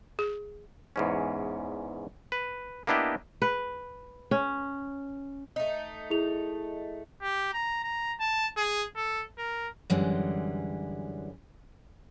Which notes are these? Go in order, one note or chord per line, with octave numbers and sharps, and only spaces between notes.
G#4
E2 G#2 C#4
B4
A#3 B3 D4 E4 G4 D#5
B4
C#4
A3 D#4
E4 G#4 F7
G4
A#5
A#5
A5
G#4
A4
A#4
F#2 D3 E3 G3 G#3